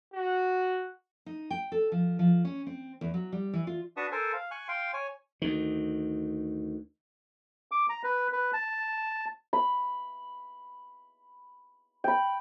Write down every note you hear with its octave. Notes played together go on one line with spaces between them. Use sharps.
F#4
D#4
G5
A4
F3
F3
C#4
C4
E2
F#3
G3
E3
F4
D4 F#4 B4 A5 C#6 D#6
A4 A#4 C5 G#5
F5
G#5 C#6 F#6
F5 G5 C6
C#5 G#5
D2 D#3
D6
A#5
B4
B4
A5
B5
G5 B5